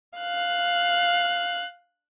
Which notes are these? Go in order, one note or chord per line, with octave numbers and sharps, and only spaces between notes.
F5 F#6